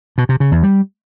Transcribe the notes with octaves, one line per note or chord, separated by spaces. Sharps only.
B2
C3
C#3
E2
G3